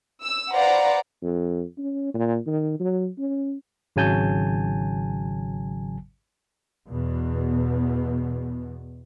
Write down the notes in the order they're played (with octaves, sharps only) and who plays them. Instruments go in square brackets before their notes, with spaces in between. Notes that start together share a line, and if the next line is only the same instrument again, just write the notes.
[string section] E6
B4 C5 D5 F5 F#5 A#5
[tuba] F2
C#4
A#2
D#3
F#3
C#4
[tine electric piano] G#1 C#3 F#3 G#5 A5 G6
[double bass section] E2 B2